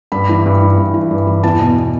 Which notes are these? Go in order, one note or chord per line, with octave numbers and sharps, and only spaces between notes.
G2 B5
E3
G2
E3
G2
E3
G2
E3
E2 A5
B2